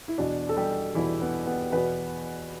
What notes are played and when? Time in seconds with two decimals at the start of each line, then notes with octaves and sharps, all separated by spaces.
0.08 E4
0.18 E2 B2 D4
0.49 A4
0.57 G3 G4
0.95 E2 B2 E3 E4
1.21 B3
1.47 B3
1.72 E2 B2 B3 B4